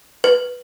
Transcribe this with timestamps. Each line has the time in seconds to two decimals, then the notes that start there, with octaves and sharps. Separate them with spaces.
0.24 B4